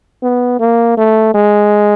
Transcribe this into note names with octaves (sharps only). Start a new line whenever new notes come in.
B3
A#3
A3
G#3